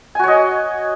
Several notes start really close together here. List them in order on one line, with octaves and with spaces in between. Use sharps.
G#5 F#4 C#5 D#5